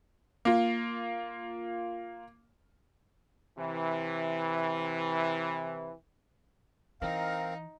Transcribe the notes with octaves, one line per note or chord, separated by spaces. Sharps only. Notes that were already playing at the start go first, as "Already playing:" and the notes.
A#3 F4
C3 E3
E3 C4 D#4 A#4 F5